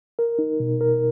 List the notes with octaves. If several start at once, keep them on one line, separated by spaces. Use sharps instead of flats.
A#4
D#4
B2
A#4